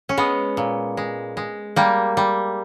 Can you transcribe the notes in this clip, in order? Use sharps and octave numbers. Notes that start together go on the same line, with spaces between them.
C#4
G#3 B3
A#2
G#3
G#3
G3 A#3
G3